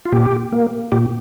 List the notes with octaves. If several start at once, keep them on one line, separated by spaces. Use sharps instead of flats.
F4
A#2 G4
A#3
A#2 G4